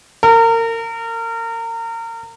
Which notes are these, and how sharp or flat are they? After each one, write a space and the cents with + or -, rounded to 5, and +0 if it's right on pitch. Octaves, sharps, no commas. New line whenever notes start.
A#4 -30